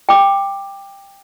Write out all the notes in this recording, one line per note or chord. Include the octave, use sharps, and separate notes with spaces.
G5 D6